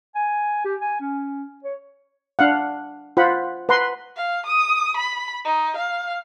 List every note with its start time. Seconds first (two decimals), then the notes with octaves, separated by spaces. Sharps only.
0.15 G#5
0.65 G4
0.81 G#5
1.00 C#4
1.64 C#5
2.39 D4 F5 F#5
3.17 F4 C5 F#5 B5
3.69 B4 F#5 A#5 C6
4.17 F5
4.46 D#6
4.97 B5
5.45 D#4
5.77 F5